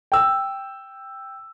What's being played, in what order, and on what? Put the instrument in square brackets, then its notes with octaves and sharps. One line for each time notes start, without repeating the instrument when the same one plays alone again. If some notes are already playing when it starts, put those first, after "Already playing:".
[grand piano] G5 E6